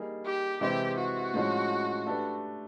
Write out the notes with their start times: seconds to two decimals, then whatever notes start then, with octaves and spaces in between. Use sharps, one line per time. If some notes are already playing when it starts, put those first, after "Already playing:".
Already playing: G3 A#3 D#4 G#4
0.25 G4
0.61 C3 E3 G#3 C4 E4 G4
0.98 F#4
1.34 A2 F3 G#3 C#4
2.06 A3 D4 G4 B4